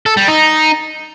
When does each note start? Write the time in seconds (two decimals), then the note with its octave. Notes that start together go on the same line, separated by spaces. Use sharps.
0.06 A4
0.17 G3
0.28 D#4